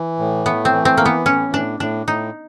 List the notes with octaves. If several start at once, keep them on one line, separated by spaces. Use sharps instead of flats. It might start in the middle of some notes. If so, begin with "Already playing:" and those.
Already playing: E3
A2
A3 B3
C4
E3
C4
E3 A#3
B3
A2 C#4
A2 D4
A2 D4
A2 D#4